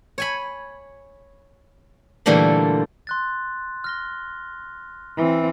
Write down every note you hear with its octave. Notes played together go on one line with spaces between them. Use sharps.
C#5 G#5 B5
A#2 D3 E3 G3 A3 A#3
C6 F#6 A6
F6 A#6 G7
E3 C4